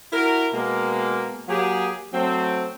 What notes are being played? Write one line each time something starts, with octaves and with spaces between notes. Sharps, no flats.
E4 F#4 A#4
B2 G#3 A#3
F#3 A#3 G4 G#4
F#3 A3 C4